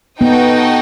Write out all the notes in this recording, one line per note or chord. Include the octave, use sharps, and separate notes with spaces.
B3 D#4 F#4 A4 D#5 G5